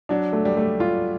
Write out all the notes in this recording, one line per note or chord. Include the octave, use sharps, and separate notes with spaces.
F#3 D4
A3
G3
A3
F4